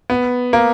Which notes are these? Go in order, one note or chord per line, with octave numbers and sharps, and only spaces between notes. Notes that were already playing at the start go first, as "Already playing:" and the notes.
B3
A#3